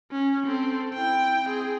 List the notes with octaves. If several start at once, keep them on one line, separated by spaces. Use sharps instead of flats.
C#4
C4 A4
E4 G5
C4 G#4